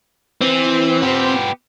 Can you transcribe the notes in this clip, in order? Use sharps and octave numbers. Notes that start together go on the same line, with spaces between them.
E3 C4
B3 G4